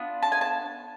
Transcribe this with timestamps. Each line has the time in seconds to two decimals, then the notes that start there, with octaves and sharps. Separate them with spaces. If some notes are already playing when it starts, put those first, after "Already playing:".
Already playing: B3 D4 F4
0.23 A5
0.32 G#5
0.41 A5